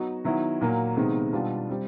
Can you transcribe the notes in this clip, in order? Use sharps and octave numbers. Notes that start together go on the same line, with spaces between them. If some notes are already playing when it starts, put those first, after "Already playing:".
Already playing: F#3 B3 D#4 F#4
D#3 F#3 B3 E4
A#2 F#3 A#3
C3 D#3 G#3 B3
B2 G3 B3 D4 F4
G3 C4